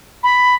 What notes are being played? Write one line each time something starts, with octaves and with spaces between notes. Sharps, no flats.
B5